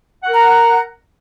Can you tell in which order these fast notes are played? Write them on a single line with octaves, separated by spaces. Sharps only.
F#5 A#4 A#5